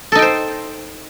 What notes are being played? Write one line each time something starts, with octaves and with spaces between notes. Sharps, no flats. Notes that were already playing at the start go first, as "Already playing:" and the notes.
D#4 A4 C5 G5